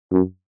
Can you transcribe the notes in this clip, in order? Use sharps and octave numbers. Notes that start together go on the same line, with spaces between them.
F#2